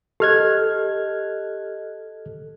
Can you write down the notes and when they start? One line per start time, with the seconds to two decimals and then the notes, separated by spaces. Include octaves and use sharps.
0.20 G4 A4 D#5 F6 F#6 G#6